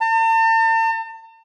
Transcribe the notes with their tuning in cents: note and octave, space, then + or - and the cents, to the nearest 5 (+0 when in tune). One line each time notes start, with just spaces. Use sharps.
A5 +45